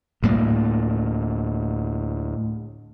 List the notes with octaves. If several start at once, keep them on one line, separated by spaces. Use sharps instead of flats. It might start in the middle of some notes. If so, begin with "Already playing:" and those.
D2 A2 G3 A#3